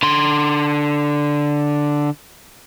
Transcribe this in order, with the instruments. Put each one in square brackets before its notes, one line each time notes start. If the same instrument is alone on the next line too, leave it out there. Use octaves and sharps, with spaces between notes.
[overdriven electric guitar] D3 C6